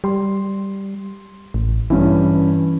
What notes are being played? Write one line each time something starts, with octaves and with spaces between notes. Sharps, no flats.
G3 C6
A1
G2 E3 C#4 E4